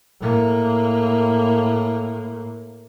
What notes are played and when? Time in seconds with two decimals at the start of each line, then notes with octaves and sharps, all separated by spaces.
0.20 A2 A#3